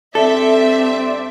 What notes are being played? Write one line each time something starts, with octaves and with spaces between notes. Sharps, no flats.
G2 C4 A4 C5 D5 E5